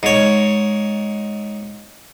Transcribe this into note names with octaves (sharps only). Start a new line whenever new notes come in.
G#2 C#5